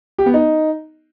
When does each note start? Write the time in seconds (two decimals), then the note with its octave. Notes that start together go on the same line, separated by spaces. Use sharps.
0.18 G4
0.26 B3
0.34 D#4